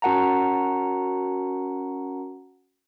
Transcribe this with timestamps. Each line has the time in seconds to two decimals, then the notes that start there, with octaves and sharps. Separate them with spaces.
0.02 C#4 F#4 A#4 F#5 A5 A#5